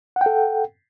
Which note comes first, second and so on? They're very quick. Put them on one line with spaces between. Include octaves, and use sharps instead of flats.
F#5 G5 A4